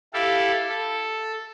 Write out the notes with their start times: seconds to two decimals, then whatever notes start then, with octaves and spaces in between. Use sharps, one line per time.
0.14 E4 G4 A4 F5
0.69 A4